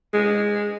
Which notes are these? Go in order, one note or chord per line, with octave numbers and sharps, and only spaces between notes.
G#3